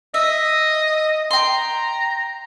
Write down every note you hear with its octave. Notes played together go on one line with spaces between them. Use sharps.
D#5 E5
G5 A#5 C6